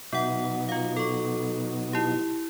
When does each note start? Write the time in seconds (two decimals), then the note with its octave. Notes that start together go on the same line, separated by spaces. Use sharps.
0.12 B2 F#3 B3 D#4 F#5
0.69 F4 F5
0.96 A4 C#6
1.93 E4 G4